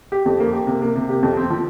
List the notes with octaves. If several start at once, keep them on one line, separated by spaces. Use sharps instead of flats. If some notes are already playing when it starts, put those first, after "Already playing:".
G4
F2
A#3
G4
C3
A#3
C3
G4
F2
C4
F3